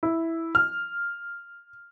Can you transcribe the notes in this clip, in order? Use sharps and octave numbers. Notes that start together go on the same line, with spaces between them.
E4
F6